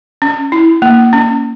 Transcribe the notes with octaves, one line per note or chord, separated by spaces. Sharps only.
C#4
E4
A#3
C#4